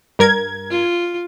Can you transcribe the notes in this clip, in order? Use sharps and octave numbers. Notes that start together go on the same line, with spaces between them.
G2 A#4 G#6
F4